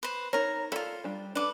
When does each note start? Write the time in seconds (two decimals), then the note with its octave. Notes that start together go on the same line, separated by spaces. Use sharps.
0.03 B4 C5
0.33 D#4 A#4 C#5 A#5
0.72 E4 F4 A4 A#4 D5
1.04 G3 D4
1.35 D4 A4 B4 D6